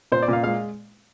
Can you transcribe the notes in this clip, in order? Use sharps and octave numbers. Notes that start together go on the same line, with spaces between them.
A#2 C5
D5
A#2 F5
G#3 F5